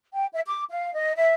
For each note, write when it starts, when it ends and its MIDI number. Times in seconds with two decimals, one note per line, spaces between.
0.14 0.26 79
0.33 0.41 76
0.45 0.63 86
0.68 0.94 77
0.95 1.13 75
1.16 1.34 76